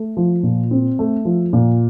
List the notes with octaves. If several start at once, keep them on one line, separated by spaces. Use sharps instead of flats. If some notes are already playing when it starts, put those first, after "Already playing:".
Already playing: A3
F3
A#2
C4
A3
F3
A#2